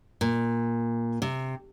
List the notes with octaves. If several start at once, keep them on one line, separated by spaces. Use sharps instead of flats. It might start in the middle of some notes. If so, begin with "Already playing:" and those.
A#2
C3